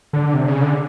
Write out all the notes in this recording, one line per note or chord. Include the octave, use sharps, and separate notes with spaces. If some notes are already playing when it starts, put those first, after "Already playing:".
D3
C3
C#3
D3